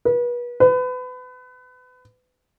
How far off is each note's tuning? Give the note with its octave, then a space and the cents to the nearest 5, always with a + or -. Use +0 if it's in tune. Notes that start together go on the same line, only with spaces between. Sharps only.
B4 -35
B4 +30